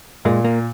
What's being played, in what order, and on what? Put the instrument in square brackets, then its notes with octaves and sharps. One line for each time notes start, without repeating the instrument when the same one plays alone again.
[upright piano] A#2 [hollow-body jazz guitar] G#3
[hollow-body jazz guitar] A#3